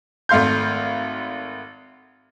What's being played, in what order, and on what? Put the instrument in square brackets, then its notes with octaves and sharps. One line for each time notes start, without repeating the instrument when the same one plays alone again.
[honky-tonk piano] G#1 A3 F5 C6 G6